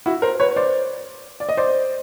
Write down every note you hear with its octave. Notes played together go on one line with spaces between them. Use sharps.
E4 F#4
A#4 C5
B4 C#5
C5 D5
D5
D#5
C5 D5